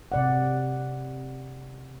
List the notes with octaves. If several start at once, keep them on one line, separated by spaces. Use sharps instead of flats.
C3 D5 F#5